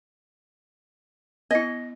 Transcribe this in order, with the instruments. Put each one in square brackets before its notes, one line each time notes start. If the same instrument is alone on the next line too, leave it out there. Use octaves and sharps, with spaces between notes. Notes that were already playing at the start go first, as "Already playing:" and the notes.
[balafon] B3 E4 [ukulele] D#5